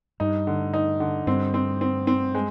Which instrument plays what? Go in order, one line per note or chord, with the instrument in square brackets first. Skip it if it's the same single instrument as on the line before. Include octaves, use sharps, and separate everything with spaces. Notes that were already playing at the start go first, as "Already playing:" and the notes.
[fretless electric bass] G2 [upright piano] D#4
[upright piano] D3
D#4
D3
[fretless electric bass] G2 [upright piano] C4
[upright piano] C4
C4
C4
G#3